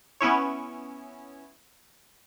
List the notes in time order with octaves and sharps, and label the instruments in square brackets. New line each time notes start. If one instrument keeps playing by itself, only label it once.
[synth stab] B3 C#4 E4 C#5